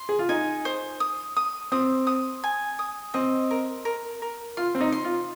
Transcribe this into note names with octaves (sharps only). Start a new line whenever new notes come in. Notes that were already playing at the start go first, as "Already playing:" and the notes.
Already playing: C6
G#4
F4
D#4 G#5
C5
D#6
D#6
C4 D#6
D#6
G#5
D#6
C4 D#5
A#4
A#4
A#4
F4 C6
C4
D#4
C6
F4